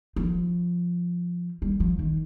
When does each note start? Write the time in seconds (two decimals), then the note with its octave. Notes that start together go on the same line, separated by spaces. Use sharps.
0.16 F3
1.62 G3
1.80 F3
1.99 D#3